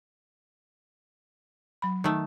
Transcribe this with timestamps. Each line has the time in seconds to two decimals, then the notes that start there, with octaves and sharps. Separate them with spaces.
1.82 F#3 B5
2.04 D#3 A3